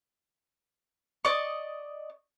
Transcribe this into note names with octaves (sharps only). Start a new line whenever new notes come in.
D5 D#5 C#6